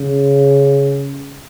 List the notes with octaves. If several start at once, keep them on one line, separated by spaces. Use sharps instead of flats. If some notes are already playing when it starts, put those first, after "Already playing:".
Already playing: C#3